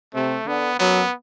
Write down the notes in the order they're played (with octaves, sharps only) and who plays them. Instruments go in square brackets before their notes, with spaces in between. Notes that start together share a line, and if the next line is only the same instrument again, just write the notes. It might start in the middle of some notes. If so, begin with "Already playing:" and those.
[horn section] C3 [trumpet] A3
[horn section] D3 [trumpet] B3
[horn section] F#2 F#3 [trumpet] B3